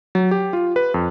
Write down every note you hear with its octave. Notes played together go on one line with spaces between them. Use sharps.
F#3
G4
F4
B4
F2